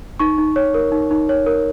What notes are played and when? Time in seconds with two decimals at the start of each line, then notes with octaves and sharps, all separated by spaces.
0.20 D#4 C#6
0.38 D#4
0.56 C#5
0.74 A#4
0.92 D#4
1.11 D#4
1.29 C#5
1.46 A#4